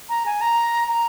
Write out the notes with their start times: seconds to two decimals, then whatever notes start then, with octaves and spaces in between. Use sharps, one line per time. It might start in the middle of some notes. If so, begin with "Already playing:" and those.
0.09 A#5
0.26 G#5
0.41 A#5
0.89 A#5